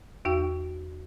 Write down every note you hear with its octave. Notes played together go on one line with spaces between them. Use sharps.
E2 D#4 F#4 G5